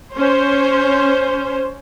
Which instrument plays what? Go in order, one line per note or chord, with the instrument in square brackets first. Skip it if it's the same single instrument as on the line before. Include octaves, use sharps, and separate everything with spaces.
[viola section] C#4 C5